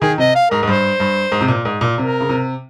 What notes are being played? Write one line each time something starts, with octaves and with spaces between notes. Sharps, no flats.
D#3 G#4
C3 D#5
F5
G#2 A#4
G#2
G2 C5
G2
G#2
C3
A#2
G#2
A#2
C3 A#4
C#3
C3